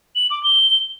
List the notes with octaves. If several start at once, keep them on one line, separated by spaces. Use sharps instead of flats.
F#7
D6
G7